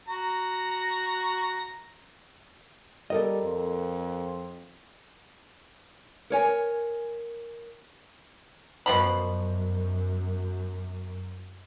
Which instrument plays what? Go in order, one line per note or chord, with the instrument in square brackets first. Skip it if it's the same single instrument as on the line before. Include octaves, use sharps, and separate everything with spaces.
[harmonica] F#4 A#5
[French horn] G3 [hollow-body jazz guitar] A4 A#4 D#5
[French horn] F2
[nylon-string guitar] A#4 C#5 G#5
[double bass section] F#2 [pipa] B2 F3 B5